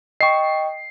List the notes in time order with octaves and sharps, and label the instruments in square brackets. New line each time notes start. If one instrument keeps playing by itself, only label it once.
[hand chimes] D#5 G5 [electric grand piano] C#6 C7